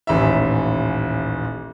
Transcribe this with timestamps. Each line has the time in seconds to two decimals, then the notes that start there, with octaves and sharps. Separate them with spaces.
0.07 D#1 A1 E5